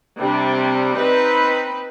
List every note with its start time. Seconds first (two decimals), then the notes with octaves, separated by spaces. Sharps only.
0.19 C3 G3 D4
0.97 C4 D#4 B4